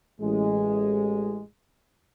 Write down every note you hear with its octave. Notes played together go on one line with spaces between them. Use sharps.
A1 G#3